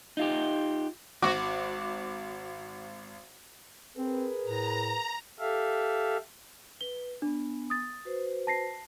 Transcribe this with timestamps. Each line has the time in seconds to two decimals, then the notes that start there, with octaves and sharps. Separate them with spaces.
0.17 D#4 F4 G4
1.22 G#1 F#4 D6
3.97 C4 G#4 A#4 B4
4.45 A2 A#5
5.40 G4 A4 E5 F5
6.81 B4 G7
7.22 B3 D4 G#5
7.70 D#6 A6
8.05 F#4 B4 C5
8.47 A5 A#6 C7